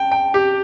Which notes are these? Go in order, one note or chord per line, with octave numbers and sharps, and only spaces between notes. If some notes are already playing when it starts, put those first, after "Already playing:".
Already playing: G5 A5
G5
G4